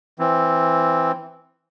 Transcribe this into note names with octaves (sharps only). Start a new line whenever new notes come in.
E3 C4